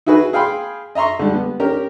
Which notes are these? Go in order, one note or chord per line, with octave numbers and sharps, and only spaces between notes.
D#4 E4 F#4 G#4 B4
G#4 F5 G5 B5 C6
D#5 E5 A#5 C6 C#6
D3 G3
B3
C#4 G4 A#4